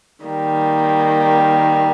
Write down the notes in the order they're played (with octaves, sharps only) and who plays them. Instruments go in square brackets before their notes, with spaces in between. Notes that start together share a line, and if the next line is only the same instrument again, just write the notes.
[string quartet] D#3 G3 A#3